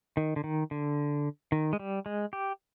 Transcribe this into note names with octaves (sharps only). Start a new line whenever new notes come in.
D#3
D3
D#3
D3
D#3
G#3
G3
G#3
G4